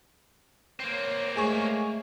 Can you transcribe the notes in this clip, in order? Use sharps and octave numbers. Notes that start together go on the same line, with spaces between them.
A#3 C4 C#5
G#3 A3 G#4 C#5